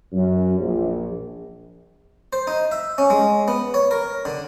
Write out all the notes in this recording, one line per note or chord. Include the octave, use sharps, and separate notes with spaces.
F#2
A#1
C5
D#4
E5
C#4
G#3
B3
C#5
A#4
D3